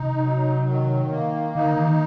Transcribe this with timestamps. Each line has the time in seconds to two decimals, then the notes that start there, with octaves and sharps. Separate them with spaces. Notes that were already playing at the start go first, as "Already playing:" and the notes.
Already playing: C3 D#4
0.23 F#3
0.67 D#3
1.11 A#3
1.55 D3 D#4
1.76 D#3